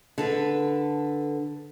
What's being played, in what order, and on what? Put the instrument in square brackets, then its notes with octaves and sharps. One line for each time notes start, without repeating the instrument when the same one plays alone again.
[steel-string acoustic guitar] D3 A4 B4